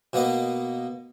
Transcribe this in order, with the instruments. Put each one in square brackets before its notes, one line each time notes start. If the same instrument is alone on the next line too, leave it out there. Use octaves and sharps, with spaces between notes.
[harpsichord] B2 A#3 B3 D#5